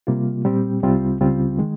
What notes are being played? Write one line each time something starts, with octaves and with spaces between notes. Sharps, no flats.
C3 G3 A#3 F4
A#2 G3 C4 G4
C2 C3 G3 C4 F4
C#2 C#3 G3 C4 F4
D#3 G#3